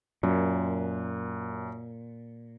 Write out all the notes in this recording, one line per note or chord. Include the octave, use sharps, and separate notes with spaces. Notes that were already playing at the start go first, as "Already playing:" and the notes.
F#2 A#2